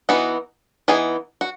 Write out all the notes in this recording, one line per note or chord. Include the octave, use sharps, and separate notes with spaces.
E3 B3 D#4 F#4
E3 B3 D#4 G#4
F#4